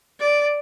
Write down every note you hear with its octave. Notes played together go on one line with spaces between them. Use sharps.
D5